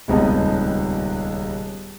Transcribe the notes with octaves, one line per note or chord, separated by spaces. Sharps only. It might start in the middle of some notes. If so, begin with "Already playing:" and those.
D#1 C#2 C3 B3 D#4 A5